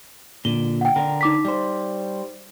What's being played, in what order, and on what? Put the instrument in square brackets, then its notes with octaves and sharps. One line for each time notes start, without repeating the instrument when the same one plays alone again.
[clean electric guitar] A#2 D3 [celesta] G7
[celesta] F#5 G5
[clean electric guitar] D3 A#4
[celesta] D#4 D6 B6
[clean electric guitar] G3 C5